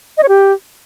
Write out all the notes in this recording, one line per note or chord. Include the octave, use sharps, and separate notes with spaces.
D#5
C#5
G4